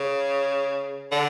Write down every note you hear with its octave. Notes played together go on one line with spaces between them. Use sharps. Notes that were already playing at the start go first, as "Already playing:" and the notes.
Already playing: C#3
D3